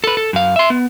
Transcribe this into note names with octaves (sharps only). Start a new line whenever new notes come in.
A4 B4
A4
F#2 F5
E5 C6
B3